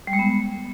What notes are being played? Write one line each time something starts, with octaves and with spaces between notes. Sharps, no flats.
G3
G#3
B3